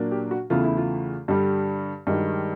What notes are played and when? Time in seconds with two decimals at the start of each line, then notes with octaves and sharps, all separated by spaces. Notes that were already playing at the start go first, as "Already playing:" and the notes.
Already playing: A#2 F#3 A#3 D4
0.11 G4
0.31 F#4
0.50 E2 C#3 E3 A3 F4
0.64 E4
0.77 F4
1.28 G2 D3 G3
2.07 G2 D#3 G#3 F#4